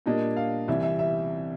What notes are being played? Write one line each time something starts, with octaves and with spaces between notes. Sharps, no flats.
A#2 G3 A#3 D4 D#5
F5
C2 C3 E3 E5
E5
E5